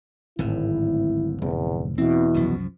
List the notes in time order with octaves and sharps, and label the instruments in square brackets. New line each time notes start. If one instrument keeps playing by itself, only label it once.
[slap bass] D1 A2 [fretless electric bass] G#1 [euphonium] E4
[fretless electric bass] F1 [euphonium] E2
[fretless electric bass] E2 B2 [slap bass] C4 [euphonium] E4
[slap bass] C2 F#2 F3